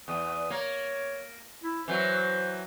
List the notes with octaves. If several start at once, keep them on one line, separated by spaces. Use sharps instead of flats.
E2 D#6
A#3 C#5
E4
E3 F#3 C5